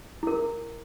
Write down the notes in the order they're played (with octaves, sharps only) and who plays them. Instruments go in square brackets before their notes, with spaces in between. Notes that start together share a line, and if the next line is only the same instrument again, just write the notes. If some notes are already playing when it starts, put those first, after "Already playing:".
[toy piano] E4 A#4